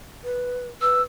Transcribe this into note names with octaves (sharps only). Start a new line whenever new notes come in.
B4
B4 E6